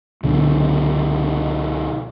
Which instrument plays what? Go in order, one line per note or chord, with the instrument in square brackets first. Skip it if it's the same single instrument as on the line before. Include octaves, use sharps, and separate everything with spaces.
[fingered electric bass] C#2 B2 D3 F#3